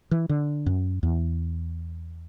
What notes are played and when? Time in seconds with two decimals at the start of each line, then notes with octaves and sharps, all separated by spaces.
0.11 E3
0.29 D3
0.66 F#2
1.03 E2